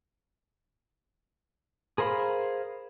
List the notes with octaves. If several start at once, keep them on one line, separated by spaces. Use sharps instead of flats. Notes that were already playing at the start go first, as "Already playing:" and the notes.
G#4 A#4 C5 F5 B5